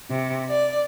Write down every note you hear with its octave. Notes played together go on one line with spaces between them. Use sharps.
C3
D5